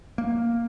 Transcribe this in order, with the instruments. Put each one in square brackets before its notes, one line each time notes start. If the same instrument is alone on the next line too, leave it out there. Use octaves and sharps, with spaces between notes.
[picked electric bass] A#3